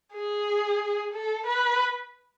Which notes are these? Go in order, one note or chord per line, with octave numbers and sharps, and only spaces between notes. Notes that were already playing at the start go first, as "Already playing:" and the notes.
G#4
A4
B4